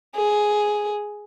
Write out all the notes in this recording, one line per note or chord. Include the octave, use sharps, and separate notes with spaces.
G#4